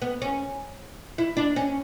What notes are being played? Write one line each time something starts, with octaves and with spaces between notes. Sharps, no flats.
B3
C#4
E4
D4
C#4